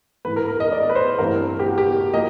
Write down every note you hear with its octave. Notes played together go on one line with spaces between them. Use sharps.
G#2 E3 A3 B4
A#4
A#4
D#5
D5
B4
C5
G2 E3 A3 C4 A#4
G4
F#4
G4
F3 A#3 D#5